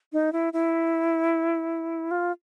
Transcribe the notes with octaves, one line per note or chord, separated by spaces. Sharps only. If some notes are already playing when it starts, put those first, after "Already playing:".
D#4
E4
E4
F4